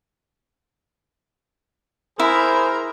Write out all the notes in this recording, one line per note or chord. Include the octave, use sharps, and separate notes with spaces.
E4 G#4 A#4 C5 B5